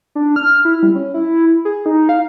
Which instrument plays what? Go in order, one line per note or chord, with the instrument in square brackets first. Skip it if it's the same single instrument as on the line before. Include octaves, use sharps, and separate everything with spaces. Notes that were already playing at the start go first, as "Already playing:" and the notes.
[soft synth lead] D4
F6
E4
G3
C#4
E4
G#4
D#4
F5